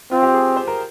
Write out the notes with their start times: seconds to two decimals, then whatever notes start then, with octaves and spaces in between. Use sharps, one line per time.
0.11 C4 F4
0.23 G4
0.34 G#4
0.57 C5
0.68 A#4